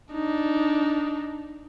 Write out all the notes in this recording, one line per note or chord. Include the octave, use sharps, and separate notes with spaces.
D4 D#4